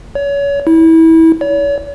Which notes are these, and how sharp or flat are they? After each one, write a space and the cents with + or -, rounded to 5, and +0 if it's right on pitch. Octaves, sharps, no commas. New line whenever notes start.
C#5 +30
E4 -25
C#5 +40